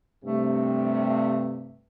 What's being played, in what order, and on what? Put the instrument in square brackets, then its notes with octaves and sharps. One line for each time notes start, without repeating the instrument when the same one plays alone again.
[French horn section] G2 C3 [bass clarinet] A3